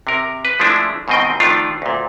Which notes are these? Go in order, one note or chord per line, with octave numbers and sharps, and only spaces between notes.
C3 A#4
B4
F3 G#3 A3 D4 E4
G#2 B2 D#3 C4 D#5 G5
D#3 F3 A3 D4 F4
D2 A#2